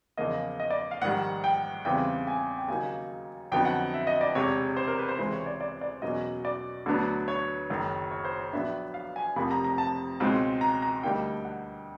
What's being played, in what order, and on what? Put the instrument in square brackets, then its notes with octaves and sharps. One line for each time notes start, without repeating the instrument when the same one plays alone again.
[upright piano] E2 C#3 F3 A#3 D#5
D#5
D5
F5
A#1 G#2 D#3 G3 F#5
G5
E2 C#3 E3 G3 C4 G5
G#5
G5
D#2 C#3 F#3 A#3 D#4 G#5
F2 D3 F#3 B3 D#4 G5
F#5
E5
D#5
D5
E1 E2 C3 C#5
C5
A#4
B4
C5
C#2 C3 E3 G#3 C5
C#5
D5
D5
D5
E2 B2 F#3 A#3 C#4 D#5
D5
D2 D3 F#3 B3 D4
C#5
F#1 F#2 D#3
C#5
C5
C#5
A#1 A#2 F#3 B3 D4 E5
F5
G#5
F1 F2 C3 F3 A#3 B5
A#5
A#5
A5
C#2 B2 G#3 C4 D#4
A#5
A#5
D2 D3 G3 A#3 D#4 G5
F#5